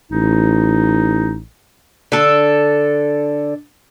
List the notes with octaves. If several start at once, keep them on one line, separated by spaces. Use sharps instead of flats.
A1 D#4
D3 A4